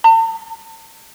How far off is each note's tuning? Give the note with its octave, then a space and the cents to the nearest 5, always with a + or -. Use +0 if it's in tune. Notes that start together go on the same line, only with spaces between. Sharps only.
A5 +45